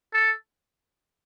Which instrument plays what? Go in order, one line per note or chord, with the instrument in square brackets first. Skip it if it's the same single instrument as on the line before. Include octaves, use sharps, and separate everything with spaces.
[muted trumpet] A4